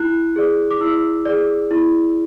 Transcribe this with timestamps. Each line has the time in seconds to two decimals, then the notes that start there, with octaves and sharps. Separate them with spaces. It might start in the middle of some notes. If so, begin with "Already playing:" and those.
Already playing: E4 F#6
0.36 G#4 D5
0.71 D6
0.81 E4 E6
1.25 G#4 D5
1.71 E4